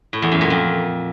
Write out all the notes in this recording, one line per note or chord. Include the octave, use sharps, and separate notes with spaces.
A2
E2
F#2
A#2
F2